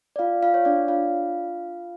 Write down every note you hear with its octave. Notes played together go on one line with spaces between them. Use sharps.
D5
F4 F5
F4 F5
C#5
D4 D5
F4 F5